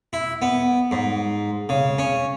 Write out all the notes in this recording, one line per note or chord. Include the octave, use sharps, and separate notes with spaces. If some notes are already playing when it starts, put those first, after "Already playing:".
E4
B3
G#2
C#3
C#4